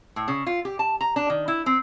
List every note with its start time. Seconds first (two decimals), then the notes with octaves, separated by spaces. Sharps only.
0.16 A2
0.28 C#3
0.47 F4
0.65 G4
0.79 A5
1.01 A#5
1.16 D4
1.30 D#3
1.48 E4
1.66 C4